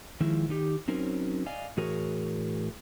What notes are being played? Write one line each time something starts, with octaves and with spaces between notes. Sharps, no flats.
D#3 F3 G#3 E4
D#3 D#4 G4
F#3 C4 C#4 D#4 A#4
D5 D#5 F5 G#5
A2 E3 F#4 G#4 A#4 C#5